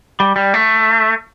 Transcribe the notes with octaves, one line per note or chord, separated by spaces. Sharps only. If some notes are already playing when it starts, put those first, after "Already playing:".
G3
G3
A3